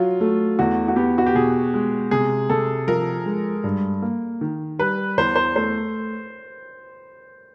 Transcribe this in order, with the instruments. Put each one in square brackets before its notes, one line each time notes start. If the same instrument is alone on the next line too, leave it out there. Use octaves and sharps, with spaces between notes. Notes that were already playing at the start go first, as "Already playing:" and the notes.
Already playing: [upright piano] F#3 [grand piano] F4
[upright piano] A3
[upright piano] E2 [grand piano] F#4
[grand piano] F#4
[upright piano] B3 [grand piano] G4
[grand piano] F#4
G4
[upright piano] B2 [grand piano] G#4
[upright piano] G#3
[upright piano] C3 [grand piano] G#4
[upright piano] C3 [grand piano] A4
[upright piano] F3 [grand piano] A#4
[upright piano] G#3
G2
A#3
D#3
[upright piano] G3 [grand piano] B4
[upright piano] E2 [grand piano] C5
[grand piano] C5
[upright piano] A3 [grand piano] C5